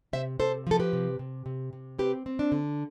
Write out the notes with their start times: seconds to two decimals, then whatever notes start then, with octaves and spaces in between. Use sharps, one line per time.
0.13 C3 C5 E5
0.40 C3 A4 C5
0.67 F3 A4
0.80 G4 B4
0.93 C3
1.19 C3
1.46 C3
1.73 C3
1.99 C4 G4 B4
2.26 C4
2.39 D4
2.52 D3